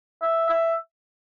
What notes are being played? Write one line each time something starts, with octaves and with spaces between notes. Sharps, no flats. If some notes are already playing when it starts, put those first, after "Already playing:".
E5
E5